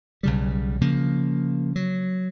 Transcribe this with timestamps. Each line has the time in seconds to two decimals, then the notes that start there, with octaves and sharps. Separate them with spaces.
0.23 B1 C#3 G3
0.81 C#3 F3 A#3
1.76 F#3